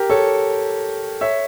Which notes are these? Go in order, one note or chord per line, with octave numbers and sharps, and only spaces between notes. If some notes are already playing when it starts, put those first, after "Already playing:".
Already playing: G4 A#4
A4 C#5
C#5 E5